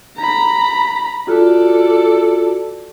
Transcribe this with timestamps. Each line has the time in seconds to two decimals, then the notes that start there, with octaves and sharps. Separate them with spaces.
0.17 A#5 B5
1.28 F4 F#4 A4 D5